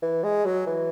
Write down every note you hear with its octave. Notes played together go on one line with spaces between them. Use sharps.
E3
G#3
F#3
E3